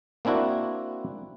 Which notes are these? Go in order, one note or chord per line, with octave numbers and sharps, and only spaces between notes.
A#3 C4 D4 E4 F#4